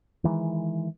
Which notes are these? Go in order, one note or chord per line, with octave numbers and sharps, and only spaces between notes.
D#3 E3 G#3